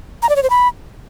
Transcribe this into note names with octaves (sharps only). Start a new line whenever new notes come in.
A#5
D5
C#5
C5
B5